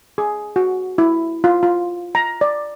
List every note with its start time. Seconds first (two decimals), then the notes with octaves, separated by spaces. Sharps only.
0.18 G#4
0.56 F#4
0.98 E4
1.44 F4
1.63 F4
2.15 A#5
2.41 D5